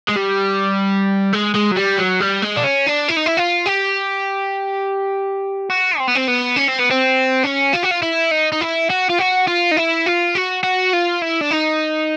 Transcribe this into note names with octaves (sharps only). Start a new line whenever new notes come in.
G#3
G3
G#3
G#3
F#3
G3
F#3
G3
G#3
D4
C#4
D4
E4
D#4
E4
F4
G4
F#4
C4
B3
C4
B3
C#4
C4
B3
C4
C#4
F4
F#4
F4
E4
D#4
D#4
E4
F#4
F4
F#4
F4
D#4
E4
F4
F#4
F#4
F4
E4
D4
D#4